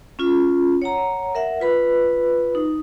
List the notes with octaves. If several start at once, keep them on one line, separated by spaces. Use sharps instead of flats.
C#4 F4
C#5 F#5 A#5
A#4 E5 F#5
F4 B4 B5
D#4